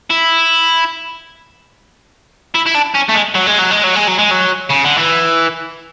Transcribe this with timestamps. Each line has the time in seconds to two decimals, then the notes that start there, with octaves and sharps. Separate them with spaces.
0.10 E4
2.54 E4
2.66 E4
2.74 D4
2.94 C#4
3.09 A3
3.15 G#3
3.35 F#3
3.47 G#3
3.59 F#3
3.71 G#3
3.84 F#3
3.96 G#3
4.08 F#3
4.19 G#3
4.31 F#3
4.70 C#3
4.85 D3
4.98 E3